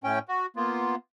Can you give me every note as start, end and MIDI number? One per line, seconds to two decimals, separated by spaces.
0.04 0.19 45
0.04 0.19 61
0.04 0.19 79
0.28 0.46 66
0.56 0.95 58
0.56 0.95 59
0.56 0.95 65